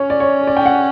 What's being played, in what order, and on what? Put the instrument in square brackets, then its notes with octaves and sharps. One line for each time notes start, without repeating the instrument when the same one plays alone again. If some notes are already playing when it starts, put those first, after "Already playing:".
Already playing: [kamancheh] C#4 [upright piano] C#5
[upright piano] D5
C#5
D5
G5
F#5